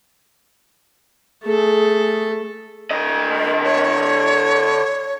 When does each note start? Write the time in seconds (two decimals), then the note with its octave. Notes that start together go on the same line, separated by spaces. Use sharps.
1.44 A3 G#4 A4
2.91 D3 D#5
3.64 C#5